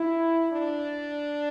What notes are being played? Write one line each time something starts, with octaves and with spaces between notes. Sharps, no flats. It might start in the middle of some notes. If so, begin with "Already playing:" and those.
Already playing: E4
D4